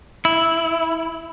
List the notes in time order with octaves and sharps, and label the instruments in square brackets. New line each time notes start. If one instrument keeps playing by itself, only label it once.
[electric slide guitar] E4